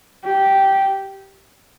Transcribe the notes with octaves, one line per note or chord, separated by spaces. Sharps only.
G4